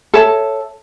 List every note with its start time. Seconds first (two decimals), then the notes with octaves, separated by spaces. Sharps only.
0.14 A4 C#5 E5 A5